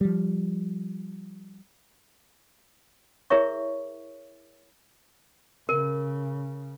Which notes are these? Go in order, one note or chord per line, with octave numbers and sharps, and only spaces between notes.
F3 G3
E4 G#4 A#4 C#5 E5 C#6
C#3 A#4